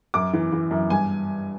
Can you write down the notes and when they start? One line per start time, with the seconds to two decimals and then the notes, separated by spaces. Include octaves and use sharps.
0.14 F#2 D6
0.33 E3
0.52 E3
0.71 F#2
0.90 G2 G#5